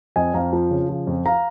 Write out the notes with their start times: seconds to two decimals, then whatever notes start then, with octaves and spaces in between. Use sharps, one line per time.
0.16 F2 D#5 G#5
0.34 F2 F5 A#5
0.53 F3
0.71 C#3
0.89 F3
1.07 F2
1.26 F5 A#5